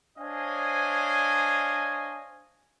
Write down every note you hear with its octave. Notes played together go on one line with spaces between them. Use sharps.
D4 C5 C#5 D#5 F5 G#5